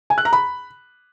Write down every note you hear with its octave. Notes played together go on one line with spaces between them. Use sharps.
G#5
F#6
A#5
B5